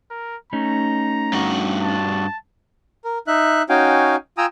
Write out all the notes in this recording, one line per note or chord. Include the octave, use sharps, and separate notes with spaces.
A#4
A3 C#4 D#4 A#5
G2 F#4
A5
A#4
D#4 E5 F#6
C#4 D#4 F#4 F5 G5 G#5
F4 G5 G#5 A#5 D#6 E6